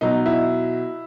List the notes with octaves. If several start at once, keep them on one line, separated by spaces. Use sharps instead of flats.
B2 F#3 D#4
E4